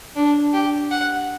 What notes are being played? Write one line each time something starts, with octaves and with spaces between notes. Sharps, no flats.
D4
G4
F#5